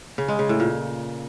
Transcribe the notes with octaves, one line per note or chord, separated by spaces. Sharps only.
C#3
G#3
C#3
A2
A#2